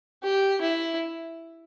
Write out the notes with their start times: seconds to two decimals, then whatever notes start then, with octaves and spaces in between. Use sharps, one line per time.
0.23 G4
0.61 E4